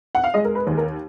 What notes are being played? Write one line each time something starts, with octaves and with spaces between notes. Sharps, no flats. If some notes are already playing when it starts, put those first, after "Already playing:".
F#5
F5
G#3 D#5
A#4
B4
D#2
A#4